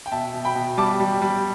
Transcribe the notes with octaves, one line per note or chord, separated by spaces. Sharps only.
G5
B2 E5 A5
B2
G5 B5
B2
G3 A5 D6
G3
G3